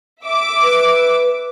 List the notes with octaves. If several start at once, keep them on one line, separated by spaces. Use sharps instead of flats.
E5 D6
B4